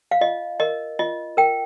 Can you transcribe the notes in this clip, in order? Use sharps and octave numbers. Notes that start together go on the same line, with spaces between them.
F5
F4 D#5
A#4 D#5
F4 D#5
A#4 G5